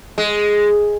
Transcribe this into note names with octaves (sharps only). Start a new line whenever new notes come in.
G#3